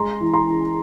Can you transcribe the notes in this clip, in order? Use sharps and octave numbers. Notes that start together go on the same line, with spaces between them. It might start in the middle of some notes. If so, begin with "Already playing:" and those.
Already playing: G#3 A#5 C6
E3
A#5 C6
E3